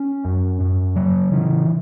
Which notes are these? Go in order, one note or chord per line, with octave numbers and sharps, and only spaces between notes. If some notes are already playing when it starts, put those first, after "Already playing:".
Already playing: C#4
F#2
F#2
C#3 F#3
C#3 E3